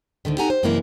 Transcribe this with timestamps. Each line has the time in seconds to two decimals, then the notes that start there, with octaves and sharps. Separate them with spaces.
0.25 D2 B2 D3 D#3
0.38 D#4 G4 A4 F#5 G#5 A#5
0.50 C5
0.63 F#2 C3 E3 G#3 A#3 E4